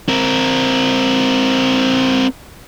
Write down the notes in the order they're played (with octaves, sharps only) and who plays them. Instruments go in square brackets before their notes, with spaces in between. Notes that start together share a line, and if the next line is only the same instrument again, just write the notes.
[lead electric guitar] C4 A#4